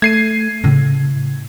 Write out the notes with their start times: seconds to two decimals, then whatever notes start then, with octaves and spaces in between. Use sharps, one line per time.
0.02 A3 G#6 C7 D#7
0.64 A2 C#3 E4